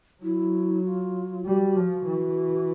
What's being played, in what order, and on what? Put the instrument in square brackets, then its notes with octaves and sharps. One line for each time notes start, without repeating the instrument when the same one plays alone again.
[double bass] F#3 [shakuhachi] E4
[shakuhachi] F4
[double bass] G3 [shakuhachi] F#4
[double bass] F3
E3